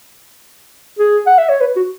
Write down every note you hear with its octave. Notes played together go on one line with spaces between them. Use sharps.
G#4
F#5
E5
C#5
B4
F#4